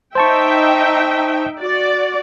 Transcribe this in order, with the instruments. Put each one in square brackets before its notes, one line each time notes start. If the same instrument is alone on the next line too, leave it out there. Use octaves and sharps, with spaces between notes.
[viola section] D#4 E5 G5 [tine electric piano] C5 A5 C#6
[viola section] F#4 D5